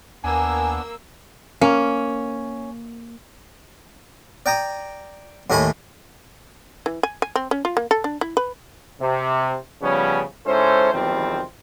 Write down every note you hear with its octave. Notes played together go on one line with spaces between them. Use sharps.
D#2 A#3 B3 D4 G#5 E6
A#3 C#4
D5 G5 A#5 D#6
D#2 A2 A3 D#5 G#5 B5
E3
G#5
G#5
C4
C#4
F4
A#3
A4
D4
E4
B4
C3
C#3 F3 G3 B3 C#4
G#2 C#4 E4 A4 C5
B1 E2 D#3 F3 G3 C4